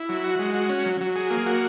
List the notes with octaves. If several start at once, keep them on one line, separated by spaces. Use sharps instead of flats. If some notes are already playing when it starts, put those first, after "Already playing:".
Already playing: E4
F#3
F#4
G#3
F#4
C#4
F#3
F#3
G#4
A#3
F#4